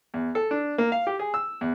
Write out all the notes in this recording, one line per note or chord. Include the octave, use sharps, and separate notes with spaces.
E2
A4
D4
A#3
F5
G4
G#4
E6
E2